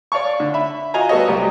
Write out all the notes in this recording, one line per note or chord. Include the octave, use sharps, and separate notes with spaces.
C#5 D5 F5 A5 C#6
D3
E5 B5
F4 F#4 D#5 F5 G#5 A#5
G3 B3 F#4 A4 C#5 D#5
C2 F#3 G3 D#6